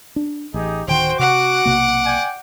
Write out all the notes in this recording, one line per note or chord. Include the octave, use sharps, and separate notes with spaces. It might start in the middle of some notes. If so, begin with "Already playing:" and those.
D4
A1 D#4 G4 G#4
D1 D#3 F#4 C5 G5
C3 F#4 F#5 D6
B1 C3 A#3
D5 G5 G#5